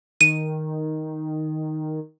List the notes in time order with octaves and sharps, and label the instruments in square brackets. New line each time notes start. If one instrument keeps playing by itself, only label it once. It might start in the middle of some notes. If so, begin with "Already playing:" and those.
[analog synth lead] D#3 [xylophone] D#7